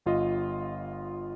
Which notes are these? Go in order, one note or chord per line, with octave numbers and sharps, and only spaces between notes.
G1 F4 D#5